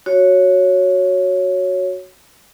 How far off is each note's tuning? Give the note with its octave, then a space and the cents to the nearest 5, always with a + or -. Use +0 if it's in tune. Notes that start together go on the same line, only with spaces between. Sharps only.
F#4 +0 C#5 +0